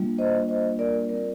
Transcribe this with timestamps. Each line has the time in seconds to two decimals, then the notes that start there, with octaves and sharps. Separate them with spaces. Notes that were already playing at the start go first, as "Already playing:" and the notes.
Already playing: G3 A#3 D4 F4
0.18 C5 D#5
0.49 C5 D#5
0.79 A#4 D5
1.09 G3 C4 F4 A#4 D5